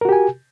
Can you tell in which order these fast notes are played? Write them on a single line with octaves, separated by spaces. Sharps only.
A#4 F#4 G4 G#5